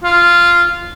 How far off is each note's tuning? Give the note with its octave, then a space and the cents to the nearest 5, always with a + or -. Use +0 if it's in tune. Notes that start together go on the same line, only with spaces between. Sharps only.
F4 -10